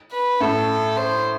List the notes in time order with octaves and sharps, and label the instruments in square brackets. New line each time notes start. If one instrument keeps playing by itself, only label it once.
[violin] B4
[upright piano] A2 [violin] A4
[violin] C5